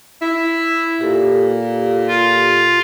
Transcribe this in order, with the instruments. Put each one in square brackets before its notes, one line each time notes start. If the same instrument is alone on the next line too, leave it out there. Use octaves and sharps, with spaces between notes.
[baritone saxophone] E4
[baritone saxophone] A#2 [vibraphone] G4 A4
[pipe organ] F4